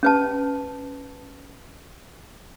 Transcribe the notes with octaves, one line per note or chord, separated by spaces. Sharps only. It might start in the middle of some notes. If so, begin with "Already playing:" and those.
C#4 B4 A5